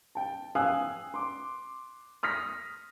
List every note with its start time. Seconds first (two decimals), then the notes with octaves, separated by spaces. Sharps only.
0.15 G5 A5
0.55 F5 G5 G#5 D#6 E6 F#6
1.14 C6 D6
2.23 D#6 F6 A#6 B6